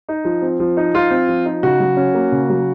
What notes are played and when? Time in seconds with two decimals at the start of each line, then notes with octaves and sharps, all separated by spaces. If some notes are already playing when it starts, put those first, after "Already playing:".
0.09 D#4
0.25 F3
0.42 C4
0.60 F3
0.77 D#4
0.94 F3 F4
1.11 C4
1.29 F3
1.45 D#4
1.63 C#3 F#4
1.80 F#3
1.97 C#4
2.14 A#3
2.32 C#3
2.50 F#3